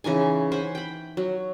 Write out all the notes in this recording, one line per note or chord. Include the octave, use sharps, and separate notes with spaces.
C#3 E3 D#4 G#5
C5 F#5 G#5 B5
G5 B5
F#3